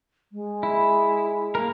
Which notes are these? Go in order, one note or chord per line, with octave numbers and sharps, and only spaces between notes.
G#3
E4
A#3 A#4